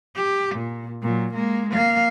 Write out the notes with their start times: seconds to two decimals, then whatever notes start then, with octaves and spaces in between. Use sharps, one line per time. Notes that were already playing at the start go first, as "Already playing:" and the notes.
0.16 G4
0.55 A#2
1.02 A#2 F#3
1.34 G#3 A#3
1.70 A#3 F5